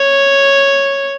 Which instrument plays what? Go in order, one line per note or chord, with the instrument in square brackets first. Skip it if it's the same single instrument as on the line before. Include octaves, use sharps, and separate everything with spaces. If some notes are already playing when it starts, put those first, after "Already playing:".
Already playing: [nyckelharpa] C#5